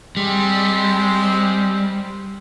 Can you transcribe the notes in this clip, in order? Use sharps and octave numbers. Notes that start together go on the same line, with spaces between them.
G3 G#3 C4